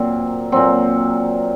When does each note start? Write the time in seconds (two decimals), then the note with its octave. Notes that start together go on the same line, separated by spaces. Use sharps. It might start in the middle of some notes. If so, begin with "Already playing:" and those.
Already playing: A#2 F#3 C4
0.52 A#2 F#3 C4